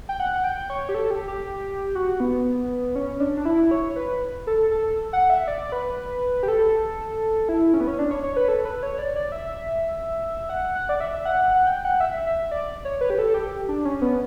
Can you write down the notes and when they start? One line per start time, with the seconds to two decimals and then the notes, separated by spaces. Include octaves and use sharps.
0.09 G5
0.20 F#5
0.44 G5
0.70 C#5
0.89 G4
0.94 A4
1.11 G4
1.28 G4
1.95 F#4
2.20 B3
2.95 C#4
3.20 D4
3.37 D4
3.45 E4
3.71 C#5
3.96 B4
4.47 A4
4.71 A4
5.13 F#5
5.30 E5
5.48 D5
5.72 B4
6.43 G4
6.48 A4
7.49 E4
7.74 C#4
7.80 B3
7.87 C#4
7.99 D4
8.11 C#5
8.23 C#5
8.36 B4
8.48 A4
8.65 B4
8.83 C#5
8.99 D5
9.16 D5
9.32 E5
10.49 F#5
10.75 F#5
10.89 D5
11.00 E5
11.25 F#5
11.51 F#5
11.67 G5
11.85 F#5
12.00 E5
12.26 E5
12.51 D5
12.85 C#5
13.01 B4
13.10 G4
13.19 A4
13.34 G4
13.69 D4
13.85 C#4
14.02 B3